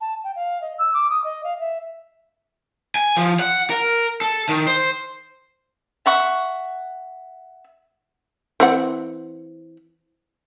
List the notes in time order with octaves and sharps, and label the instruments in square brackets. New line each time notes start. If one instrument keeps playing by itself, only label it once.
[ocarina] A5
G5
F5
D#5
E6
D6
D#6
D#5
F5
E5
[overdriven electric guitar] G#5
F3
F#5
A#4
A4
D#3
C5
[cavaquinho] E5 F#5 C#6
[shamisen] E3 C4 F#5